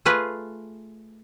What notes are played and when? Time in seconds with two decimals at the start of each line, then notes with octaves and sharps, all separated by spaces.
0.05 A3 F4 G#4 B4